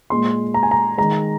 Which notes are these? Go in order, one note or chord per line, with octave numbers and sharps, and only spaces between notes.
A#2 G#3 C6
A#5
G#5
A#5
D#3 G#3 A#5